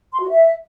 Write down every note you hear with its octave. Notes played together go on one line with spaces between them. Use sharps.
C6
F#4
E5